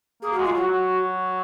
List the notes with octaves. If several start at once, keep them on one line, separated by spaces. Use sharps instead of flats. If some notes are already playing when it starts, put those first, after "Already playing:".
A#3 G#4
G#3 F#4
G#3 F4
F#3 F#4
F#3